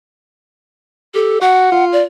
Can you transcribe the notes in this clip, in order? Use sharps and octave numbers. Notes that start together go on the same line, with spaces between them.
G4 A4
F#4 F#5
F4
D5